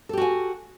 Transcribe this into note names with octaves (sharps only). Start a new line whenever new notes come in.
F#4 G4 A4 G#5